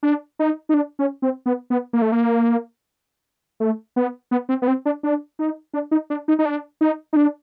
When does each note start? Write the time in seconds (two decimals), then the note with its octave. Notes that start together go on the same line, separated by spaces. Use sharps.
0.03 D4
0.39 D#4
0.69 D#4
0.74 D4
0.99 C#4
1.22 C4
1.46 B3
1.70 B3
1.93 A#3
2.02 A3
2.12 A#3
3.60 A3
3.96 B3
4.31 B3
4.49 C4
4.62 B3
4.68 C4
4.85 D4
5.03 D4
5.39 D#4
5.73 D4
5.91 D#4
6.10 D4
6.28 D#4
6.39 D#4
6.45 D4
6.81 D#4
7.13 D#4
7.16 D4